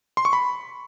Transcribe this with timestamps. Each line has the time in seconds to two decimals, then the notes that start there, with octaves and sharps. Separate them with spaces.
0.17 C6
0.25 C#6
0.33 B5